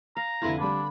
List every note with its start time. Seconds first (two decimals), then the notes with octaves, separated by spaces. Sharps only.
0.17 F5 A#5
0.42 F1 D3 E4 B4 F5 C6 G#6
0.60 G3 A3 D4 B5